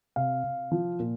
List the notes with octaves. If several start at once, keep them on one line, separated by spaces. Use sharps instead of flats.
C3 F5
C3
F3
A#2